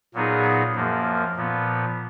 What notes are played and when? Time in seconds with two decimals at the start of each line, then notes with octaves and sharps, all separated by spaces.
0.14 A#2 F#3 B3 D#4 G#4
0.75 F#2 F3 A#3
1.36 A#2 F3 B3